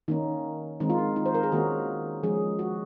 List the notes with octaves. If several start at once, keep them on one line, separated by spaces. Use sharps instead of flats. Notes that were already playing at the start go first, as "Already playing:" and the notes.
D#3 A#3 C#4 D#4
D#3 G#3 C4 D#4
F4
D#4
D#4
C5
A#4
G#4
D#3 A#3 C#4 F#4
F3 G#3 C#4 G#4
F#4